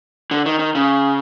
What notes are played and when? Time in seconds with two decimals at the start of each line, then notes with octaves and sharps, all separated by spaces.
0.31 D3
0.46 D#3
0.59 D#3
0.75 C#3